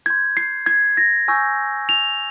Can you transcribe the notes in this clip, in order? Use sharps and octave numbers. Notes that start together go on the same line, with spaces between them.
C6 G6 G#6
C7
G#6
A#6
G#5 C#6 E6 G6
F7